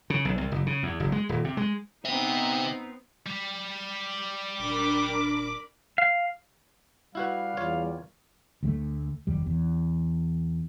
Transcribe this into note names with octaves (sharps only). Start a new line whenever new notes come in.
C#3
B1
C2
F#1
C#3
E2
F#1
G#3
D#1
C3
G#3
B3 C4 D#4 C5 E5
G3
D#1 D4 A#4 B5 D6
F5
G3 E4 F#4 B4 F5
E2 F4 C#5
D2 F#3 A3
F1 D#2 G3
E2